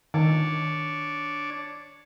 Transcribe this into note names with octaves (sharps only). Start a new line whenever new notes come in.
D#3 D4 C#5 D5